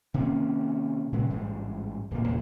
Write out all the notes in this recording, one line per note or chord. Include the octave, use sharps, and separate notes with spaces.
C3 D#3 A#3 C#4
A#2 C#3 E3 G#3
A1 G#2 G3 G#3
D1 A#1 D3 A#3
D#2 A#2 C#3